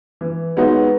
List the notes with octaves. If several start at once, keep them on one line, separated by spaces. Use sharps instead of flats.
E3
G#3 B3 D#4 F#4